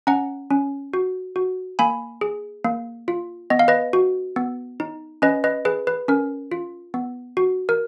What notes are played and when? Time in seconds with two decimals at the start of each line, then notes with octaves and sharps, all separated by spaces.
0.07 C#4 F#5 A#5
0.50 C#4
0.93 F#4
1.36 F#4
1.79 A#3 G#5 B5
2.21 G#4
2.64 A#3
3.08 F4
3.50 B3 D#5
3.59 F5
3.68 B4 D#5
3.93 F#4
4.36 B3
4.80 D#4
5.22 C#4 B4 D#5
5.44 B4 D#5
5.65 G#4 B4
5.87 B4
6.08 C#4 A#4
6.51 F4
6.94 B3
7.37 F#4
7.69 A#4